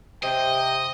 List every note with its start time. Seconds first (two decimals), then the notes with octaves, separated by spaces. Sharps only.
0.23 C3 D#5 G5